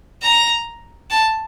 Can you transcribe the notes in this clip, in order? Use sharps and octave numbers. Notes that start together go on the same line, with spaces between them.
A#5
A5